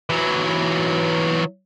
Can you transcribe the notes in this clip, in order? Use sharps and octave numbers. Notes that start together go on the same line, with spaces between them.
E3 F#3